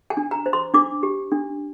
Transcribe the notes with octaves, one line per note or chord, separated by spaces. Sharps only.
G#5
D4
A#5
C5
C6
D4 D6
G4
D4